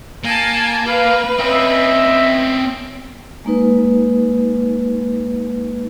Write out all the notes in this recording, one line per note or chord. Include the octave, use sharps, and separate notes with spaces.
A#3 G#5 A5
B4 F5
C4 C#4 D#5 E5
G#3 A#3 D#4 B4